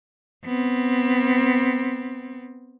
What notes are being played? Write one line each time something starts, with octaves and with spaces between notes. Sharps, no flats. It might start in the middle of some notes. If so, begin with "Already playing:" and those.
B3 C4